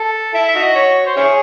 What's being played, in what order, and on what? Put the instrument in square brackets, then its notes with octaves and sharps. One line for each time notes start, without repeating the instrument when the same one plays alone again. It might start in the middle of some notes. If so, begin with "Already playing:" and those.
Already playing: [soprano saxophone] A4
[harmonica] E4 [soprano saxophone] E5
[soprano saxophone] E5
[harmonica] D#4 F#4
[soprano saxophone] D#5
C#5
C5
[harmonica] C#4 E4 G#4 [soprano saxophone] C#5